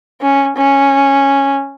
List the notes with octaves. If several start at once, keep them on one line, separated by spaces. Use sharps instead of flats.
C#4
C#4